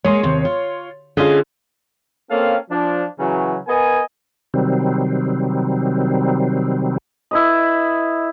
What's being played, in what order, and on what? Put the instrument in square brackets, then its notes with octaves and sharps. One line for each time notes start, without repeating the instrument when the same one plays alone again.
[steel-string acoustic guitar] G#3 A#3 G#4 [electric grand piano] C#5 C6
[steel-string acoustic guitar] D#2 C3
F4
[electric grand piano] D3 C#4 F4 [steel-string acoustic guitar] G#4 D#5 F5
[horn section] A#3 C4 C#4 A4 F5
F3 D4
C#3 E3 F#3
B3 A#4 D#5 G#5
[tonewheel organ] C3 D#3 F#3 G3 C4
[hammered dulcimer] E4 B4 D#5